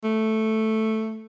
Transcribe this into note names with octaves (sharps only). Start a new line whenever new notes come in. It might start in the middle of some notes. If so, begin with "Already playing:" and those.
A3